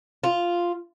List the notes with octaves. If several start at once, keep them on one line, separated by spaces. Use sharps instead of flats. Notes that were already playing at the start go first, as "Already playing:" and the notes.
F4